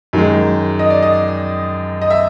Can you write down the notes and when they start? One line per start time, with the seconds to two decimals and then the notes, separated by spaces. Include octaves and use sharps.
0.13 F#2 D#3 G#3
0.79 D#5
0.90 D5
1.02 D#5
2.02 D#5
2.10 E5